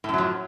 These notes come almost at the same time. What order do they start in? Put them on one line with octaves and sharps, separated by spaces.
A2 F#2 F#3 F3